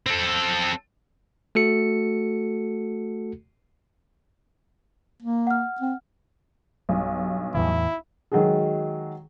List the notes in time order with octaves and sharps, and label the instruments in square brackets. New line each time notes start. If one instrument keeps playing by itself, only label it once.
[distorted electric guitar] C4 A4
[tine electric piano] A3 F#4 A4 C#7
[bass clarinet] A#3
[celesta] F#5 F6
[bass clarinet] C4
[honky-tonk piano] B1 G2
[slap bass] E2 A2 E3 [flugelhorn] E4
[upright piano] D#3 F#3 G#3 F#4 G#4